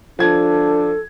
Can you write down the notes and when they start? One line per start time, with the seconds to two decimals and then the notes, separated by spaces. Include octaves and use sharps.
0.19 F3 D4 A4 G#6